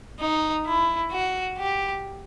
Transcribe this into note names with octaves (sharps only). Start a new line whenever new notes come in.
D#4
E4
F#4
G4